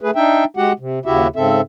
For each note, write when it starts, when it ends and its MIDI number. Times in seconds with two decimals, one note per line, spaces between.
0.01 0.11 57
0.01 0.11 68
0.01 0.11 71
0.16 0.45 62
0.16 0.45 63
0.16 0.45 76
0.16 0.45 79
0.57 0.73 56
0.57 0.73 66
0.57 0.73 67
0.57 0.73 78
0.80 0.99 48
1.06 1.27 39
1.06 1.27 49
1.06 1.27 64
1.06 1.27 66
1.06 1.27 67
1.06 1.27 76
1.36 1.61 44
1.36 1.61 49
1.36 1.61 60
1.36 1.61 69
1.36 1.61 76